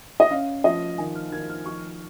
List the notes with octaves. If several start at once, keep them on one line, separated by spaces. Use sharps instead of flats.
D#5
C#4 F5
F3 D#5
D#3 G#5
F6
D#3 G#6
F6
F3 C#6